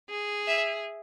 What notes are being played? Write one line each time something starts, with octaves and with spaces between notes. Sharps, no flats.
G#4
E5